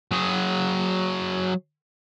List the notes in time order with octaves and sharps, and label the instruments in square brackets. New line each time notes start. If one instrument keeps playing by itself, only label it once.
[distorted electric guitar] F#3 G#4